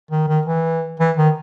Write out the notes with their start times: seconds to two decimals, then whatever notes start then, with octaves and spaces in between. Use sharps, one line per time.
0.11 D#3
0.28 D#3
0.46 E3
1.00 E3
1.17 D#3